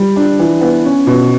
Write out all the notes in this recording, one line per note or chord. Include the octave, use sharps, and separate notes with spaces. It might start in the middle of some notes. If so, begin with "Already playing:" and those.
Already playing: G3
D4
E3
B3
C#4
B2